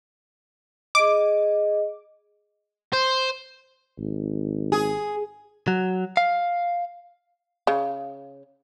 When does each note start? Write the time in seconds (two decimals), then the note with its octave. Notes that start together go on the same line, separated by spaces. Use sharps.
0.95 G#4 D#5 D6
2.93 C5
3.98 G#1
4.72 G#4
5.68 F#3
6.17 F5
7.67 C#3